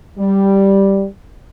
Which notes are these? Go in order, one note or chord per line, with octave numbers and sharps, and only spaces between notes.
G3